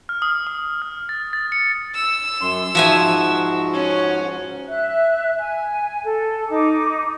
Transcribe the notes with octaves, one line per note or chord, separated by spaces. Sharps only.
F6
D#6
D#6
F6
A6
A6
C#7
E6
F#2 C6
G#2 F3 F#4 E5 G#5
C#4
E5 F#6
G#5
A4
D#4 D6